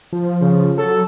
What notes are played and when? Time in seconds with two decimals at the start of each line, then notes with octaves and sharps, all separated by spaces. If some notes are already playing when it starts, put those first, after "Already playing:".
0.13 F3
0.41 C#3
0.78 F#3 A4